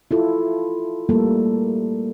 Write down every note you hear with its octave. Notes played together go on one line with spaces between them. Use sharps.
E4 F4 A4
G3 A3 A#3 A4